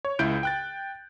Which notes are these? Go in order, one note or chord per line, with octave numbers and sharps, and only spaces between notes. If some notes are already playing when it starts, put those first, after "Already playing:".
C#5
C#2 E4 G6 D7
G5 F#6 A6